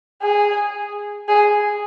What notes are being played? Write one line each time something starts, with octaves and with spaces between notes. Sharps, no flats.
G#4
G#4